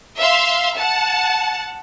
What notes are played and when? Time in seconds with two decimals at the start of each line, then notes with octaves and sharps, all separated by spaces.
0.19 E5 F5 C6 F6
0.77 F#5 A5